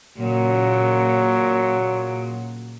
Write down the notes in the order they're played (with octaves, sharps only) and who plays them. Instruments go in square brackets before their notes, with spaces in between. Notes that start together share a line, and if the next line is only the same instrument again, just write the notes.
[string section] A#2 C#3 [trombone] F#3